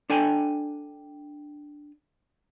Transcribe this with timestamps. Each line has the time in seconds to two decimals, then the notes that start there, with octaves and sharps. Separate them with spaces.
0.10 D4 A4 G5 G#5